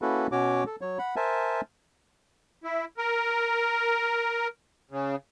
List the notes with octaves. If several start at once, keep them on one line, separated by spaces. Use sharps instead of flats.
A#3 C#4 E4 F#4 A4 B4
B2 C#4 F#4 C#5 D6
A4
F#3 C#5
F#5 B5
A#4 C5 E5 G#5 A5
E4
A#4
C#3